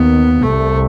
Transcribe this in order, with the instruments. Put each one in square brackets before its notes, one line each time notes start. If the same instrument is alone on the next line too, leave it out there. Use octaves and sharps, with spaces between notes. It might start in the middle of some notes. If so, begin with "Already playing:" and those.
Already playing: [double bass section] D#2 D#3 [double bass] B3
[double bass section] C2 C3 [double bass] A3